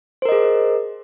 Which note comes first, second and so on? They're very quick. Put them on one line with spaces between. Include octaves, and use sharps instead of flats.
C5 A#4 D#5 G#4